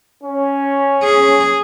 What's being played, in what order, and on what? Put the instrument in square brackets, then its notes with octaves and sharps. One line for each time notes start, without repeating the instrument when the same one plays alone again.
[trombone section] C#4
[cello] G#4